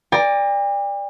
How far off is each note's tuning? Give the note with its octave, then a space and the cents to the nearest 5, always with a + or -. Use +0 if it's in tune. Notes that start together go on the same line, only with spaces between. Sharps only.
D5 +0 G5 +45 A#5 +0